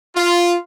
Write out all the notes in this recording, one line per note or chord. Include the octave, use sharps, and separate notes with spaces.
F4